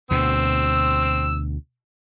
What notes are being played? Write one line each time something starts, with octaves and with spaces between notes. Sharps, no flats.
D2 B2 C4 E6